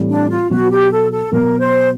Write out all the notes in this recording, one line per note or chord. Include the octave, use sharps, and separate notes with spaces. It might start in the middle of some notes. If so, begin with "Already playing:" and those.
Already playing: A2 E3 G3 C4
D4
F4
B2 F#3 B3 F#4
G4
A4
A4
B2 F#3 B3 A#4
C5